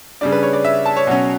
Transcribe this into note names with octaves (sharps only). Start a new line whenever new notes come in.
C#3 G3 D4 D5
B4
C#5
D5
E5
A5
C#5
B2 F#3 C#4